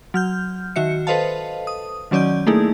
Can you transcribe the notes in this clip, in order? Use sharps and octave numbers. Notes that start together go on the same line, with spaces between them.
F#3 F6 G6
D#3 F#4 E5 C#7
A4 B4 C5 D#5 F5 A5
D#6
D#3 F#3 C#4 D5 D#5 G6
A3 A#3 D#4 E4 G#4